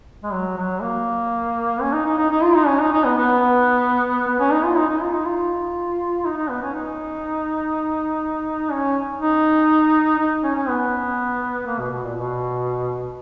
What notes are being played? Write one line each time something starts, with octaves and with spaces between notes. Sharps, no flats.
G#3
F#3
F#3
A#3
C#4
D#4
D#4
D#4
D#4
F4
D#4
C#4
D#4
D#4
B3
B3
B3
C#4
D#4
F4
D#4
D#4
F4
D#4
F4
D#4
D#4
B3
C#4
D#4
C#4
D#4
D#4
C#4
C#4
B3
A#3
B2
B2
A#2
B2